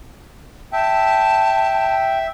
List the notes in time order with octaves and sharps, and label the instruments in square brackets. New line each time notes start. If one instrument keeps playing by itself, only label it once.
[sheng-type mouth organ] E5 [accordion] G5 [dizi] A5